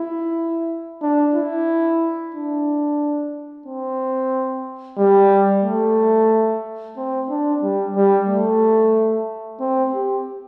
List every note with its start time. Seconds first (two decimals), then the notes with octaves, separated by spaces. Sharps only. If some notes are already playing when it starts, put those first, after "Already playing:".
Already playing: E4
1.02 D4
1.34 E4
2.34 D4
3.66 C4
4.98 G3
5.64 A3
6.97 C4
7.30 D4
7.63 G3
7.96 G3
8.28 A3
9.60 C4
9.94 G4